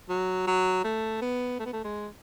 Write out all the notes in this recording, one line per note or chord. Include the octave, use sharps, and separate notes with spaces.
F#3
F#3
A3
B3
A3
B3
A3
G#3